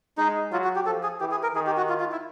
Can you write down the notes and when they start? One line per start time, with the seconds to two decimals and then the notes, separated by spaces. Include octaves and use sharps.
0.18 G#3 D#4
0.52 F#3 F4
0.64 F#4
0.75 G4
0.86 F3 A4
1.03 G#4
1.20 E3 G4
1.31 G#4
1.43 A#4
1.54 D#3 G#4
1.66 G4
1.77 F#4
1.89 F4
2.00 F4
2.12 E4